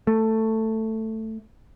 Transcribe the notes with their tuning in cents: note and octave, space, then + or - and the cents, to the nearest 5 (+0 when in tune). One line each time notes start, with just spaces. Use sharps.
A3 +10